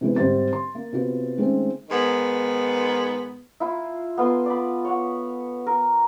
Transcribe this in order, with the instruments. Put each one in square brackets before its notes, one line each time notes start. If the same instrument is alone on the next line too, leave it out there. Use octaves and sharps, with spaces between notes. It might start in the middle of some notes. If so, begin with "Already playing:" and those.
[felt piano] C3 E3 G#3 B3
G#1 G3 G4 C5 A6
C6
A#3
C3 B3 F4 F#4 B4
D#3 G#3 A3 C4 C#4
[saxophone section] G#2 D#3 B3
[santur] E4 F4
B3 F4 A4 C6
D5 B5
C#5 F#5
A#4